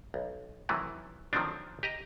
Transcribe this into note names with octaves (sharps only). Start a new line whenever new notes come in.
B1
C3 D#3 E3 F#3 A3
D#3 F3 F#3 A3 C4 D4
G4 D#5 A#5